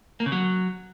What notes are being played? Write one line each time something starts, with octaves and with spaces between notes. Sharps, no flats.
A#3
C#3
F#3